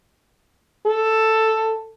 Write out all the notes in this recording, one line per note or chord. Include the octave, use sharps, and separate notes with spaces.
A4